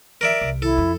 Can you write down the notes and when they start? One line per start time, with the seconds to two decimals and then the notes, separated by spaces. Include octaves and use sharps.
0.21 A#4 D5 E5
0.41 C2
0.62 E4 A4
0.78 F2